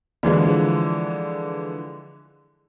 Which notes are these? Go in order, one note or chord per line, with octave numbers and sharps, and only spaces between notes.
D3 E3 F3 G#3